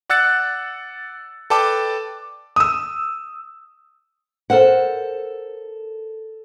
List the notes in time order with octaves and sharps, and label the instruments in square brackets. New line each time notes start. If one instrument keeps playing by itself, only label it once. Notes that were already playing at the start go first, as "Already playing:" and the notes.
[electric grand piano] D5 F#5 E6 F#6 A6 C#7
A4 B4 D5 G5 A5 D6
[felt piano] D#6 E6
[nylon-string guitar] A4 A#4 C5 F#5